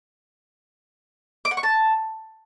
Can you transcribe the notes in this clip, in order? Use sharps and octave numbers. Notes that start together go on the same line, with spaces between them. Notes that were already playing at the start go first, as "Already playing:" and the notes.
D6
F#5
C#6
A5